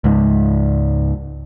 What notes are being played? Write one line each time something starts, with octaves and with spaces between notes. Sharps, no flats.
C#2 G#2